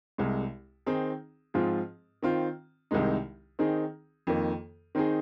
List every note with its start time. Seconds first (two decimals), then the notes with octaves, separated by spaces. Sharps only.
0.18 C2 C3 G#3
0.86 D#3 C4 D#4 G#4
1.54 G#2 F3 C4 F4 G#4
2.23 D#3 C4 F4
2.91 C2 C3 D#3 G#3 D#4
3.59 D#3 C4 D#4 G#4
4.27 F2 D#3 A#3
4.95 D#3 C4 D#4 G#4